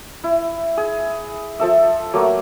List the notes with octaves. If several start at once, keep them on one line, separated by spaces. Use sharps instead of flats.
E4
G#4
F3 A4 E5
F#3 A3 A#3